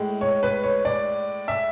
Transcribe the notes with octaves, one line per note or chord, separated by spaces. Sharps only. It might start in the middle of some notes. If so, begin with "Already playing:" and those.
Already playing: A2 G#3
C#5
B4
C#5
D5
E5